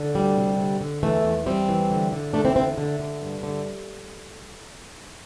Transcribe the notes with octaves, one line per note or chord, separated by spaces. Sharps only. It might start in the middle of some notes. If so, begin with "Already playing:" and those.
Already playing: D3
D2 G3
C3
D3
D3
E2 E3 A3
E2
E2 G3 C4
E3
D3
D3
E2 A3 D4
C4 E4
D3 C4 E4
D3
D3
G2
D3